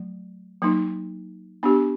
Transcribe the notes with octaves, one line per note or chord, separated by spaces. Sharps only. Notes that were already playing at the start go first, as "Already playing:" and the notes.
Already playing: F#3 A3
F#3 A#3 D#4
B3 D4 G4